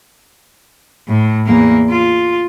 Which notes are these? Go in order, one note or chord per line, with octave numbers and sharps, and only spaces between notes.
A2
E2 A#3
F4